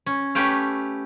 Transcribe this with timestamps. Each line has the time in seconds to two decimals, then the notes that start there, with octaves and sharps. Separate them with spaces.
0.06 C#4
0.35 A3 C#4 G4 B4 F5